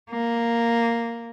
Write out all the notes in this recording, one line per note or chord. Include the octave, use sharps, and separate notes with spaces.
A#3